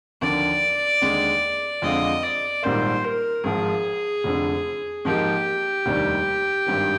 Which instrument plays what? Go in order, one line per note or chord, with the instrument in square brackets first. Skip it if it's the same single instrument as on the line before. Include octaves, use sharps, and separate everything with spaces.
[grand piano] D#2 D3 F3 A#3 [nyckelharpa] D5
[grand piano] D#2 D3 G#3
[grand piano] F2 D3 G#3 C4 F4 [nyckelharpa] D#5
[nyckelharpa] D5
[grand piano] A#1 G#2 D#3 G3 A#3 [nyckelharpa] C5
[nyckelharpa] A#4
[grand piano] G#1 G#2 F3 [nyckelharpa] G#4
[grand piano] F1 F2 D3
[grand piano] G#2 F3 A#3 D#4 [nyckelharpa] G4
[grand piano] F1 D#2 D#3 G3 D4
G#1 G2 D#3